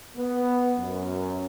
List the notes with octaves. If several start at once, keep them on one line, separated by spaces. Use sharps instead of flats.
B3
F#2